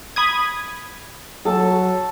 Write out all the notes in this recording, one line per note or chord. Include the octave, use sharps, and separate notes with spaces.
B5 D#6 G#6
F#3 A4 A5